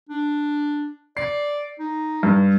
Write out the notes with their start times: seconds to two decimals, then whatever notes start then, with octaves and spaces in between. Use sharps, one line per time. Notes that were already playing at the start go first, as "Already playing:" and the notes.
0.09 D4
1.17 D5 C7
1.79 D#4
2.23 G2